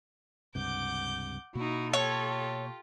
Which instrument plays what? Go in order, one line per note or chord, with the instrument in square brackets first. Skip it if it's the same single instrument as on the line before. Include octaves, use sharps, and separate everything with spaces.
[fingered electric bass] C#2 G2 C3 [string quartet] F#5 D6 G6
[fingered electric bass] B2 A#3 [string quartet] D#4 E4 [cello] F#4
[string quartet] F4 G4 [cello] A4 [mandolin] C#5